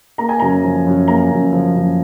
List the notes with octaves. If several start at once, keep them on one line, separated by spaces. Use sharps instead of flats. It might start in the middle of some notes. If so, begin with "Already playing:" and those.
A#3 A#5
G#5
F#2 A#5
F3
F#2
A#3 A#5
F#2
F3
F#2